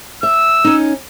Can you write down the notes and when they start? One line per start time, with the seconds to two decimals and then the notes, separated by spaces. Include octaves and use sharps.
0.23 E5 E6
0.64 C#4 D#4